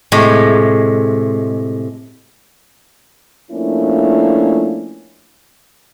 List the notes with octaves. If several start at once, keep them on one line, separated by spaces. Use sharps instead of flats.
A2 C3 G#3
F3 A3 A#3 C#4 D4 E4